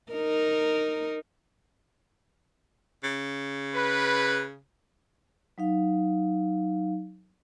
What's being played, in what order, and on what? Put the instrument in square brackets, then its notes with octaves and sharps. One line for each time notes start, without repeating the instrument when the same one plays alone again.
[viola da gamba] D#4 A#4
[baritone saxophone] C#3
[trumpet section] B4
[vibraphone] F#3 D#4 F5